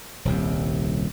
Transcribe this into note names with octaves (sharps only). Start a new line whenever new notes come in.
D#1 C2 C3